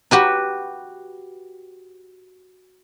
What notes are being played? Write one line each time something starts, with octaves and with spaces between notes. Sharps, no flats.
F#4 G4 B4